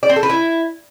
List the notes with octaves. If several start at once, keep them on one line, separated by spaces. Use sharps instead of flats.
D5
C4
A4
B4
E4